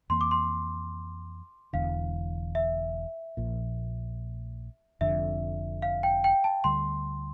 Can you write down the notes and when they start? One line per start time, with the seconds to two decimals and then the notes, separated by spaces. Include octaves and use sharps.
0.10 F2 E3 A#3 C6
0.21 D6
0.31 C6
1.73 E1 E2 D3 F5
2.55 E5
3.37 A#1 A#2 F3
5.01 F1 F2 D3 E5
5.82 F5
6.03 G5
6.24 G5
6.44 A5
6.64 D2 D3 G3 C6